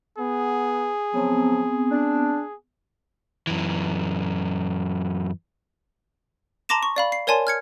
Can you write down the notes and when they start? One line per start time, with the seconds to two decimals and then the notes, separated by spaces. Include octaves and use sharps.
0.18 B3 G#4
1.14 C#3 F3 F#3 B3 C4
1.91 D4
3.47 F#2 E3
6.69 A5 A#5 C6 D6 A#6 E7
6.83 C#6
6.96 D5 F5 B5
7.12 C7
7.27 A#4 C#5 D5 G#5 A5 C6
7.47 F6 G#6 C#7